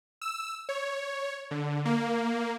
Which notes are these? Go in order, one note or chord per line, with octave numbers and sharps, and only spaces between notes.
E6
C#5
D3
A#3